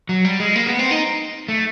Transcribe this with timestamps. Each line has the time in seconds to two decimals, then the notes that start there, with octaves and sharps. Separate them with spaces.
0.09 F#3
0.25 G3
0.40 G#3
0.56 A#3
0.67 B3
0.79 C4
0.91 D#4
1.48 A3